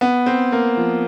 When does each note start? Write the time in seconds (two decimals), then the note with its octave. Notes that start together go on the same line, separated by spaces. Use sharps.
0.01 B3
0.26 C4
0.52 A#3
0.77 F3